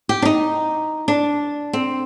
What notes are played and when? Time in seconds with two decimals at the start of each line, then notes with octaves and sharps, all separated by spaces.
0.09 G4
0.22 D4
0.25 D#4
1.08 D4
1.73 C4